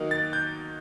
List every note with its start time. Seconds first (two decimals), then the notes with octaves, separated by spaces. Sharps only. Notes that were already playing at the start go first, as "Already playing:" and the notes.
Already playing: D#3 F#3 A#3 D#4
0.11 A6
0.33 G6